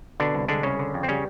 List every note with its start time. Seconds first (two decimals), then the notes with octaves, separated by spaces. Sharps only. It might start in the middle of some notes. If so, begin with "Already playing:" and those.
0.20 B2 D3 D4
0.35 C2
0.48 D3 G#3 D4
0.63 C2 C#3 C#4
0.79 D3
0.94 F2
1.03 C4
1.08 C#3 G3 C#4